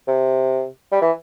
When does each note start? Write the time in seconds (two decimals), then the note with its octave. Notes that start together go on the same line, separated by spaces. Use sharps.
0.07 C3
0.91 G3
1.02 E3